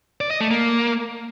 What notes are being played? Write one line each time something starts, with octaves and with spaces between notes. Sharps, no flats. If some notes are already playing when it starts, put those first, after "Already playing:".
D5
D#5
A3
A#3